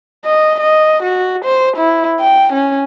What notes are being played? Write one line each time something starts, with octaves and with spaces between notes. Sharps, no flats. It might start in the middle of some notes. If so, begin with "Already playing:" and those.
D#5
D#5
F#4
C5
E4
G5
C#4